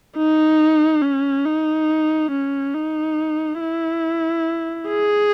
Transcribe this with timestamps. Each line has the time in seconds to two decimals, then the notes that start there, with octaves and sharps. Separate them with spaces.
0.16 D#4
1.02 C#4
1.45 D#4
2.31 C#4
2.74 D#4
3.60 E4
4.88 G#4